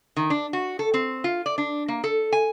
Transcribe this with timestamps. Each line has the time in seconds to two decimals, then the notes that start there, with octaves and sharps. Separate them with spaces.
0.16 D#3
0.30 D4
0.53 F#4
0.79 A4
0.94 C4
1.24 F4
1.46 D5
1.58 D4
1.88 A#3
2.04 A4
2.32 G#5